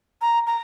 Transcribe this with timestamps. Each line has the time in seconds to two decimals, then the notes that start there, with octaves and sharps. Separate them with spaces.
0.22 A#5
0.47 A#5